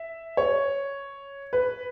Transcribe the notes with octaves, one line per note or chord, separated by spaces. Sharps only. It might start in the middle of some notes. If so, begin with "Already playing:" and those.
Already playing: E5
C#5
B4